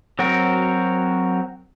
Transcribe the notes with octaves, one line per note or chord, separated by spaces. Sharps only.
F#3 C4 F#4 A#4